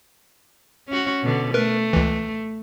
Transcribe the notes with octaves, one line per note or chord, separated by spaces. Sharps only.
C#4 F#4
B2 D3
A3 A#4 B4
C#2 E3